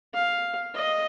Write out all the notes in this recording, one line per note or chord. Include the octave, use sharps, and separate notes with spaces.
F5
D#5